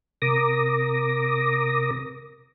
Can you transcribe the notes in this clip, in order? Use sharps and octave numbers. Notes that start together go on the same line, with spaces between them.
C3 A#4 D6 D#6 A#6